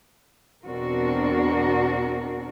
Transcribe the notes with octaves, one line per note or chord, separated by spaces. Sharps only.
E2 B2 C4 D4 F#4 A#4